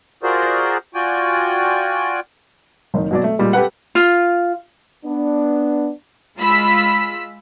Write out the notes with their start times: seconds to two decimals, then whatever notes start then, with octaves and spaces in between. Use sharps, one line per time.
0.23 F4 F#4 G#4 A#4 C5 D5
0.95 F4 F#4 D5 G5 G#5
2.94 F#1 D#3
3.11 B2 F#3 D5
3.24 A3
3.39 A#2 G3 G#3
3.53 G4 A4 B4 F#5
3.95 F4
5.05 B3 D4
6.39 G#3 F4 B5 E6 B6